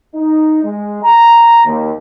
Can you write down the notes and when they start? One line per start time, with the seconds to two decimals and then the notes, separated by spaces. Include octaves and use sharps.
0.15 D#4
0.63 G#3
1.03 A#5
1.65 D#2